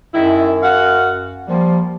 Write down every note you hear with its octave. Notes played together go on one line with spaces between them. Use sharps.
F#2 D#3 G#3 E4
F#4 F5 F#5
F3 G3 A#3